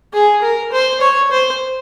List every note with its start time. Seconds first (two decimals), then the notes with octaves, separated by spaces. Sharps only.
0.13 G#4
0.42 A#4
0.72 C5
1.01 C#5
1.31 C5